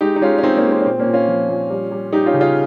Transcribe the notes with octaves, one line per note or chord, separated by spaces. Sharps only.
G#3 D#4 G4
D#4
G#3 C#4 F4
C#4
G#3 C4 D#4
A#3 C#4
G#3
C4
C#4
A#2 C4
A#3 C#4
A#2
C#4 F4
F3
A#2
G3
G3
G3 D#4 G4
C#4 F4
C#3
C#4 F4